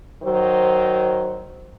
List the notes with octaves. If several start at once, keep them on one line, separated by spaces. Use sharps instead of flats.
D#3 F#3 C5